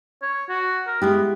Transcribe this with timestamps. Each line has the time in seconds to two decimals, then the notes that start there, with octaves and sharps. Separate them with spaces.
0.22 C#5
0.49 F#4
0.87 A#4
1.02 G#3 B3 E4 G4